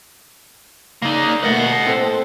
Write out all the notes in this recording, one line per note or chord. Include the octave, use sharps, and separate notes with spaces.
C#3 A#3 D#4 D5
B2 A3 A#3 D#5 F#5
A2 C4 A4